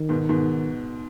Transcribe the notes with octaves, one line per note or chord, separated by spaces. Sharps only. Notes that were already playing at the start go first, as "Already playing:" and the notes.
Already playing: D#3
G#2 B2
G#2 B2